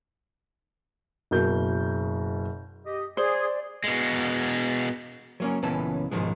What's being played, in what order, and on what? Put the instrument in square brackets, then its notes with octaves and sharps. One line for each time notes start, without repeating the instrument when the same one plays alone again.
[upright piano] F#1 B2 A#4 G6
[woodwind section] G4 D#5
[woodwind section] G#4 [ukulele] C5 [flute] D5
[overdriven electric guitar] B2 G#3
[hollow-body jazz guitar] F#3 A#3 C#4
C#2 A#2 E3 B3 C#4 A5
C#2 G#2 B2 D#3 F3 G#3